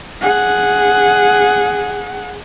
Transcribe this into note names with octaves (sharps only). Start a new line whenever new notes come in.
G#4 F#5